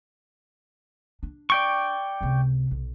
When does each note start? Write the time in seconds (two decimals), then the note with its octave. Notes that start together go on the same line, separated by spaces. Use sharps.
1.23 D4
1.50 D5 G5 C#6
2.21 C#2 C3
2.71 B1